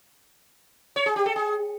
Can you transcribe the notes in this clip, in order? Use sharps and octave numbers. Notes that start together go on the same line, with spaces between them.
C#5
G#4
G4
A4
G#4